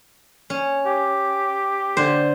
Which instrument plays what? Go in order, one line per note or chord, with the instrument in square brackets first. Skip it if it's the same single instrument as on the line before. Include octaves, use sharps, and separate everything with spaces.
[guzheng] C#4
[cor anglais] G4
[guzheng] D3 C5